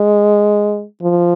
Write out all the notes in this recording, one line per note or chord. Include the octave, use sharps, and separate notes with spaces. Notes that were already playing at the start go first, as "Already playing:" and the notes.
Already playing: G#3
F3